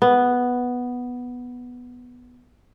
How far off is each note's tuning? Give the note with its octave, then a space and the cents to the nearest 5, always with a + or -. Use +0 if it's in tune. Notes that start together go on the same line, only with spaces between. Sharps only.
B3 +0